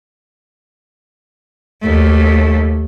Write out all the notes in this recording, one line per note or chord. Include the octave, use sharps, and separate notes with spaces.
D#2 A3